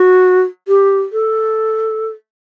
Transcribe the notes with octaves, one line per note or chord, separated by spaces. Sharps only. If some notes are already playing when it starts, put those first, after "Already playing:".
Already playing: F#4
G4
A4